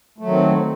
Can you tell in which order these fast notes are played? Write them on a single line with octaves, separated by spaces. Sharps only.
A3 F#3 D#3 C4